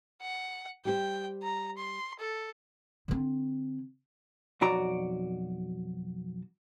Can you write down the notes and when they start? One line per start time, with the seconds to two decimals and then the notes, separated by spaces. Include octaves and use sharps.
0.21 F#5
0.85 G3 G4 C5 G5
1.43 A#5
1.78 C6
2.19 A4
3.08 D3 C4
4.61 B1 F2 F#4 D5 A#5